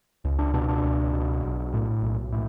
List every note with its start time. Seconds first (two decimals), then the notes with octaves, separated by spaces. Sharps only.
0.25 C#2
0.39 D4
0.54 B2 D4
0.68 D4
0.84 C#2
1.13 B2
1.43 B1
1.74 A2
2.02 B1
2.32 A2